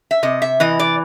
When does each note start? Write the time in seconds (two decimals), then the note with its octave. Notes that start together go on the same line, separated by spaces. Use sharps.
0.11 E5
0.23 C3 D#5
0.42 E5
0.60 E3 D#5
0.79 D5